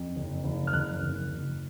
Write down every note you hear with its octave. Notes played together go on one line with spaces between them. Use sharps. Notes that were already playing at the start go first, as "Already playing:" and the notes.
Already playing: F2
F#1
F#1
F6
F#1 F#6
F#1
F#1